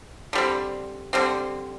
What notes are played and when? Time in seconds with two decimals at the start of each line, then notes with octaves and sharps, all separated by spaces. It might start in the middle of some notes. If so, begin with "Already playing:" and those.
0.33 D3 G3 C4
1.13 D3 G3 C4